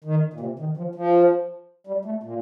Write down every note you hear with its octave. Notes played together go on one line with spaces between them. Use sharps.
D#3
A#2
C3
D#3
F3
F3
G3
A3
A#2